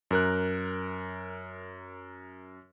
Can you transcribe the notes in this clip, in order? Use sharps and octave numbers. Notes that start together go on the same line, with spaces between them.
F#2 A#4 F#6